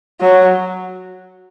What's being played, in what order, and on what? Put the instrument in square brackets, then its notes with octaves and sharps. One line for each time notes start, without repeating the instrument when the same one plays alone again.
[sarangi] F#3